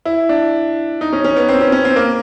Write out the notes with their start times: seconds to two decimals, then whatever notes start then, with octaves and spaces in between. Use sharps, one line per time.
0.05 E4
0.29 D4
1.01 D#4
1.13 C#4
1.24 C#4
1.36 B3
1.49 C4
1.61 C#4
1.72 C#4
1.85 C4
1.96 A#3